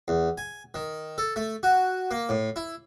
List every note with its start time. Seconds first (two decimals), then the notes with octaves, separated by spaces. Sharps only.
0.08 E2
0.38 G#5
0.74 D#3
1.18 A4
1.36 A3
1.63 F#4
2.11 A#3
2.29 A2
2.56 E4